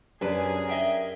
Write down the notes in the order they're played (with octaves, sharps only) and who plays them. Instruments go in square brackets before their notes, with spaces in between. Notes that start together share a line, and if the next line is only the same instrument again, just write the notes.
[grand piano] F#2 [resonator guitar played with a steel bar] D4 B4 [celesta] G4 D5 [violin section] G#4 A#4
[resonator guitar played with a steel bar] D#5 E5 G5